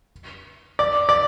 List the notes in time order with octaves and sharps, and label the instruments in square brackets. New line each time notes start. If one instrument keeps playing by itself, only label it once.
[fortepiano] D5
D5